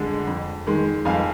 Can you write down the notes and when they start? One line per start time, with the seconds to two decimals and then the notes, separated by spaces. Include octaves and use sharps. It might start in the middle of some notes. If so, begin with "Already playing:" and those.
Already playing: F2 D3 G#3
0.27 F2
0.67 D#3 G#3
1.05 F2 F5 G#5